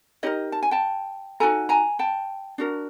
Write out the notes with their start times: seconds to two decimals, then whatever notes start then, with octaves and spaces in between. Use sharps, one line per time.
0.23 D#4 G4 A#4 C#5 D#5
0.52 A5
0.63 G#5
0.71 G5 A5
1.40 D#4 F#4 A4 G#5 A#5
1.69 G#5 A#5
1.99 G5 A5
2.58 D4 F#4 A#4